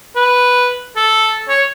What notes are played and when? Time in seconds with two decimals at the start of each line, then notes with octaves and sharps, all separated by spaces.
0.16 B4
0.97 A4
1.49 C#5